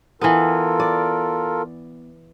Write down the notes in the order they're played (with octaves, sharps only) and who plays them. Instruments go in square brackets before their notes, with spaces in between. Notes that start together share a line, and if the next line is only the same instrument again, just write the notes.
[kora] E3 B3 [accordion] F4 A4 A#4
[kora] D5